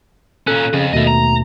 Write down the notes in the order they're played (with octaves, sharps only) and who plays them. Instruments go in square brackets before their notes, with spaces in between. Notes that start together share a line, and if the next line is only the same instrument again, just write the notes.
[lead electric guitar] A#2 C#4 [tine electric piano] A4 F#6
[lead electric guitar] F2 [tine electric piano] C#3
[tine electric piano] D#2 B2 A3 [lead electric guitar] A4 D#5
[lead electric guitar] A#5